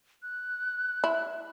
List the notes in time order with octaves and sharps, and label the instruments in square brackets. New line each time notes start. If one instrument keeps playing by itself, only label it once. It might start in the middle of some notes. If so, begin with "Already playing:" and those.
[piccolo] F#6
[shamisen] E4